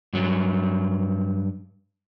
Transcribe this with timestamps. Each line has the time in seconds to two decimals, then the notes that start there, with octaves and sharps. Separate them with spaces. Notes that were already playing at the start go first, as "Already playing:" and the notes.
0.13 G2 F#3